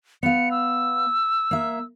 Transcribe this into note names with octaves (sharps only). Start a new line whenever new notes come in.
B3 F5 C#7
E6
A#3 E5